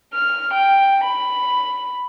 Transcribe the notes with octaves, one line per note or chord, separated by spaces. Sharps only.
F6
G5
B5